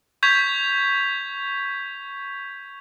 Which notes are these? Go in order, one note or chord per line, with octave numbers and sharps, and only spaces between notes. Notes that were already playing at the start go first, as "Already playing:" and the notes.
C#6 G6 G#6 B6 F7